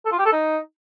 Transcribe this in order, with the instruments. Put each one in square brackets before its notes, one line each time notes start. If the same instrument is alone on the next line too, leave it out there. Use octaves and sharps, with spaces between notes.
[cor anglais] A4
F4
G4
A4
D#4